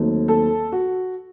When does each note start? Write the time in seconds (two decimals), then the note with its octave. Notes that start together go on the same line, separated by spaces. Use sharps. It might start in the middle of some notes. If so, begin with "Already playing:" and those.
Already playing: D#2 D#3 F#3 A3 C4
0.28 A4
0.72 F#4